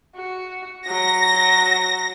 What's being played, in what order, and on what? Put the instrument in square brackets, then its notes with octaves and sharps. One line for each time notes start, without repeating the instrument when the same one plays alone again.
[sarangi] F#4
[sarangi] F#3 [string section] A#6